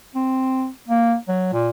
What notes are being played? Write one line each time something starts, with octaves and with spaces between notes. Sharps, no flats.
C4
A#3
F#3
A#2